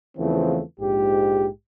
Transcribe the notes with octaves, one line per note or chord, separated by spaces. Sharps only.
E2 C#3 E3 F3 A3 C4
A#1 G#2 G4